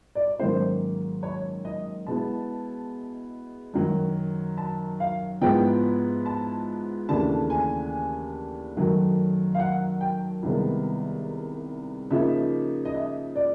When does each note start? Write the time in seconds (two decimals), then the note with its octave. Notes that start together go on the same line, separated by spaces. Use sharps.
0.15 D5
0.28 C#5
0.39 G#2 D#3 F#3 A#3 C#4 C5
1.23 C#5
1.65 D#5
2.06 B2 G#3 B3 E4 A5
3.74 F#2 D#3 F#3
4.57 A5
5.00 F5
5.41 G#2 F3 G#3 B3 E4 G5
6.26 A5
7.09 D#2 C#3 E3 A3 D4 A5
7.50 G#5
8.76 F#2 D#3 F#3 A3
9.55 F5
9.60 F#5
10.01 G5
10.43 C2 C3 D#3 G#3 B3
12.10 C#3 F3 A#3 D#4 E5
12.85 D#5
12.95 E5
13.36 D5